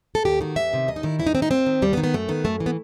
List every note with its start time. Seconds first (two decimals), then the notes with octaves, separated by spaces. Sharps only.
0.15 A4
0.25 D#2 G4
0.40 D#3 F#4
0.56 E2 E5
0.73 C3 D#3
0.88 D#2 D#5
0.96 D#4
1.03 D#3 E4
1.19 E2 E4
1.27 D#4
1.34 D#3 C4
1.42 D#4
1.50 D#2 C4
1.66 D#3
1.82 D#2 G3
1.93 B3
1.97 D#3
2.04 B3
2.14 F#2 A3
2.28 D#3 B3
2.45 F#2 A3
2.60 E3
2.66 B3